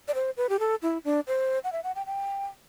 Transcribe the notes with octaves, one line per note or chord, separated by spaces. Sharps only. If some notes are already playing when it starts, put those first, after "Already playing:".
D5
C5
B4
G4
A4
E4
D4
C5
F#5
E5
F#5
G5
G5